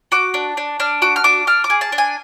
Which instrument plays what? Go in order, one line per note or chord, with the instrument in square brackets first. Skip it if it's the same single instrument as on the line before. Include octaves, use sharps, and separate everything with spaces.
[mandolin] F#4 D6
D4
D4
D4 F6
F#4 D6
F6
D4 D6
D4 F6
D6
G#4
A5
D4
G#5